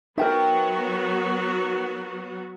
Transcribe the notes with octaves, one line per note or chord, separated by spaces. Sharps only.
F#3 B3 D#4 F#4 A#4 E5 G5